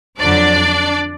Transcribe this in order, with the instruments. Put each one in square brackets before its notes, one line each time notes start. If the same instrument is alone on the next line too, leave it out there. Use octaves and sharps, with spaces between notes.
[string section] F2 D3 F#3 D4 D5